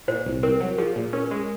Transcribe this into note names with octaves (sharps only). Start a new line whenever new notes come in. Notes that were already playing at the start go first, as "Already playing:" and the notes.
A#2 C5
C2
C4 A#4
F#3
F3 G#4
A#2
C#4 A#4
G#3